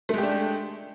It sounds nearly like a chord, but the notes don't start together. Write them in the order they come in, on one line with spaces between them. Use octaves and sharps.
A3 G#3 G4 D4